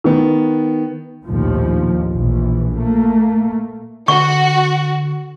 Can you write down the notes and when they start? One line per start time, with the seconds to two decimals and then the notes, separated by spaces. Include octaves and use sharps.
0.04 D#3 B3
1.25 A#1 D#2 A2 F3
2.15 A#1 E3
2.76 A3 A#3
4.08 D3 F#4 C#6